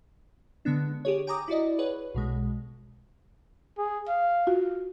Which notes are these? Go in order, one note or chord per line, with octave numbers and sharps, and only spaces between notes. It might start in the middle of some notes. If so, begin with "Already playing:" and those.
D3 G#3 B3 D4
G4 G#4 C#5
G5 G#5 A#5 D6 D#6
E4 F#4 D5 D#5
G#4 B4 C#5 F#5
B1 B2 G#3
G#4
F5
F4 F#4